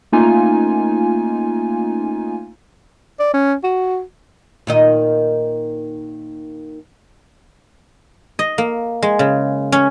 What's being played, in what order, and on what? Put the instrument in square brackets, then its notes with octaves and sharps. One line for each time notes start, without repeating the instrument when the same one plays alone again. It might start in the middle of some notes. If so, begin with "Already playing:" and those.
[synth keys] A3 A#3 C#4 D#4 F4 G#5
[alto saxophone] D5
C#4
F#4
[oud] A#2 D#3 D#5
[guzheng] D#5
A#3
G#3
C#3
C#4